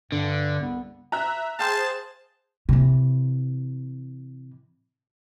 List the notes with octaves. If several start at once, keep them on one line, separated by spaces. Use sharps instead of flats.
G2 D3
C2 C#3 B3
E5 A#5 F#6
G#4 C5 F5 G5 A5 C6
C3 E3